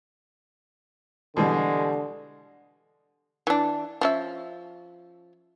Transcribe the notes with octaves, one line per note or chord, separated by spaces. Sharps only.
B2 D3 E3 G3 G#3
E3 D4
F3 C#4 E5